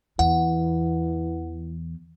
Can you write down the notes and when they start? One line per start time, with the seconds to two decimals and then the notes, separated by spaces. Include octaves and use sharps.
0.19 E2 E3 F#5